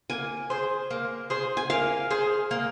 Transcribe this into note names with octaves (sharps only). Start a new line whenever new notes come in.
A#3 G#5
G#4 C5
A#3
G#4 C5
G#5
A#3 F5
G#4 C5
A#3